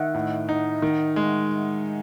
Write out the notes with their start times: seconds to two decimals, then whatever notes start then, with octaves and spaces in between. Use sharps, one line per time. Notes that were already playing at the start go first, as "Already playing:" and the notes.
Already playing: D#3 D#5 E5 F#5
0.14 A2
0.49 D#4
0.82 D#3
1.16 G#3